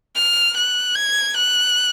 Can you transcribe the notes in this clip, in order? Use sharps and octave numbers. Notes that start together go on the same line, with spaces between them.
F6
F#6
G#6
F#6